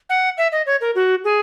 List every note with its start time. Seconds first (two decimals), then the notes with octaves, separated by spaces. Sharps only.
0.10 F#5
0.38 E5
0.52 D#5
0.66 C#5
0.81 A#4
0.95 F#4
1.24 G#4